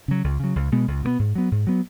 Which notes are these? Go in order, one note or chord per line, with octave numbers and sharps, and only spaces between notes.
C#3 F#3
C#2
C#3 F#3
C#2
B2 G#3 B3
C#2
B2 G#3 B3
G#2
F#3 B3
G#2
F#3 B3